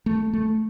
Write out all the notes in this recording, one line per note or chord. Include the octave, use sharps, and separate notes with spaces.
A3
A3